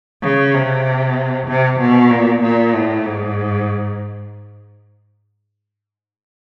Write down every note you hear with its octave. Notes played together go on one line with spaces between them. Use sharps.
C#3
C3
C3
B2
A#2
A#2
A2
G#2